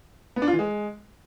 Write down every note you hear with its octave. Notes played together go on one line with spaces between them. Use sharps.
B3
D4
F4
E3
G#3